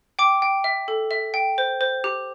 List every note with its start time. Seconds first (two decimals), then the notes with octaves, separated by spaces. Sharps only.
0.19 G5 D6
0.42 G5
0.64 E5
0.88 A4
1.11 E5
1.34 G5
1.58 C5
1.81 C5
2.04 G4